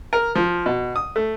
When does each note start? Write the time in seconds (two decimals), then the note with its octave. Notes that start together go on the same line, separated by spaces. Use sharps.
0.13 A#4
0.35 F3
0.66 B2
0.96 D#6
1.16 A3